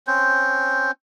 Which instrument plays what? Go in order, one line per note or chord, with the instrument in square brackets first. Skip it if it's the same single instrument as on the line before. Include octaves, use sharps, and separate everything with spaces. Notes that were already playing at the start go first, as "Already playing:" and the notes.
[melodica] C4 C#4 C5